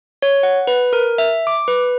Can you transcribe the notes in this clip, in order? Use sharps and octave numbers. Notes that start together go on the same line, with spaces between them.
C#5
F#5
B4
A#4
E5
D6
B4